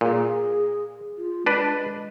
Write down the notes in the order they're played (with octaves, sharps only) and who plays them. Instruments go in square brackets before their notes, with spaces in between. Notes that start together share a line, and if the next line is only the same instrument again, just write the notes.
[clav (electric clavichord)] A#2 [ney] G#4
[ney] F4
[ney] G#3 [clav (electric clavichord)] D4 B4